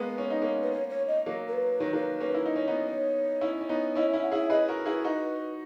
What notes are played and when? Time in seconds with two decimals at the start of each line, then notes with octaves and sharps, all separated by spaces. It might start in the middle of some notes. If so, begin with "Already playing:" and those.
Already playing: G#3 A#3 B3 B4
0.18 C#4
0.30 D#4
0.42 A#3 C#4
0.62 B4
0.72 C#5
0.90 C#5
1.08 D#5
1.26 F#3 A#3
1.48 A#4
1.53 B4
1.80 D#3 F#3
1.93 F#3 A#3
2.20 A#3 C#4
2.34 E4
2.46 D#4
2.56 C#4
2.68 B3 D#4
2.87 C#5
3.41 C#4 E4
3.61 C#4
3.69 B3 D#4
3.95 C#4 E4 D#5
4.10 C#4 E4 E5
4.23 F#5
4.32 E4 G#4 E5
4.50 G#4 B4 D#5
4.68 F#4 A#4
4.86 E4 G#4 B4
5.04 D#4 F#4